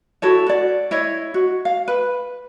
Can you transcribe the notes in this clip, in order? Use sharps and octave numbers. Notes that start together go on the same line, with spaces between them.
E4 F#4 A4 C#5
F#4 D5
E4 C#5 D#5
F#4
F5
B4